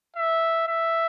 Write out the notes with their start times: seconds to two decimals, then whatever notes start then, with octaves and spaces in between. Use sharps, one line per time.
0.16 E5
0.67 E5